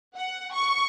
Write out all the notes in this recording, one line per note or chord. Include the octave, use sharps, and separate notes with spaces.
F#5
C#6